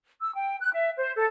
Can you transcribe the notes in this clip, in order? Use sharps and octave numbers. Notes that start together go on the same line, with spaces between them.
E6
G5
F#6
E5
C5
A4